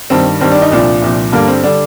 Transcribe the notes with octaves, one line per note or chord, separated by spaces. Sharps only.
G2 D#3 G3 C4
G2 D#3 G3 C4
D4
D#4
C2 A#2 F3 D4
C2 A#2 F3
G2 D3 G3 A#3
C4
D3 G3 D4